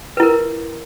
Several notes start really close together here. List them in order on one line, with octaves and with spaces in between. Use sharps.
B4 E4 A#4